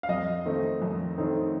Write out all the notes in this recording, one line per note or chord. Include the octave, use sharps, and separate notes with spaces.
F5
F2 D#5
D#3 A3 C4 D#4
F2
D#3 A3 C4 D#4